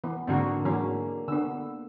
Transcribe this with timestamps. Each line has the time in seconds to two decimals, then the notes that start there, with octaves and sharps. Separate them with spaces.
0.04 E3 B3
0.27 G#2 D3 A#3 C4 F#4
0.65 E3 F#3 A#3 C#4
1.28 D3 B3 E6